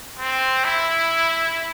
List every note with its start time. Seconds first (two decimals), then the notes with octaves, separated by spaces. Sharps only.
0.19 C4
0.65 E4